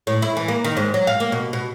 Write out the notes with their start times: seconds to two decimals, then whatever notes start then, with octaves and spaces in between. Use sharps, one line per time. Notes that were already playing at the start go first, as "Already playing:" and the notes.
0.07 A2
0.22 E4
0.37 E3
0.48 A#3
0.64 D#3
0.77 G#2
0.94 F#3
1.07 F5
1.20 A#3
1.32 B2
1.53 B2